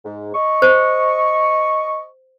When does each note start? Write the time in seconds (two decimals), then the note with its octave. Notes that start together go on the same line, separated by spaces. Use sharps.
0.05 G#2
0.35 D#5 C#6
0.62 C5